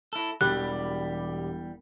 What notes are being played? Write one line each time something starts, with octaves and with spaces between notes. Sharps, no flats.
E4 A4
E1 E2 G3 G4 B5 F#6